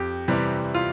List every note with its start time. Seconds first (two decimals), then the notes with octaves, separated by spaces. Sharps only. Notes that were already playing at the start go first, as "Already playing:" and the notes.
Already playing: F2 G4
0.28 C3 E3 G3
0.75 F4